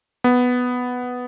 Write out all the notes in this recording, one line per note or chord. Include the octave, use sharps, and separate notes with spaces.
B3